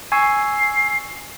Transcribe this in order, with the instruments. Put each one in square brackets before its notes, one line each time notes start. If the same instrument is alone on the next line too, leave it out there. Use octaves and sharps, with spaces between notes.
[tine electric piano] G#5 C#6 E6 [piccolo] C7